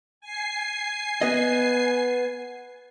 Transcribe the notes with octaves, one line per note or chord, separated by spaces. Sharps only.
G#5 C7
B3 D#5